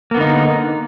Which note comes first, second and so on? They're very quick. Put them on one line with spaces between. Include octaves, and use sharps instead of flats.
A#3 B3 D3 D#4